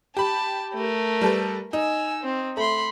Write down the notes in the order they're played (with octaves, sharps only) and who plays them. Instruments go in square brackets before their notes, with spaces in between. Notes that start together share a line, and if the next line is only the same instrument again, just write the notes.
[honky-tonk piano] G4 B5 [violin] A5
[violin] A3 A#4
[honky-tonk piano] G3 A4 B4
[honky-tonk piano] D#4 [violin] G#5 E6
[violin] C4
[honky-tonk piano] A3 [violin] B5 C6